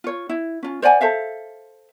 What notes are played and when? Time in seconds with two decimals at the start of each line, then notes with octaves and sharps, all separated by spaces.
0.04 F4 C#5
0.29 E4
0.63 C#4 F4
0.82 C5 D5 F#5 G#5
1.01 A4 C5 E5 F5